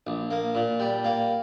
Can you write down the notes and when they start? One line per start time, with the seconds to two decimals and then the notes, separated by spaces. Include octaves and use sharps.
0.07 A#1
0.31 A#3
0.55 A#2
0.80 G3
1.04 A#3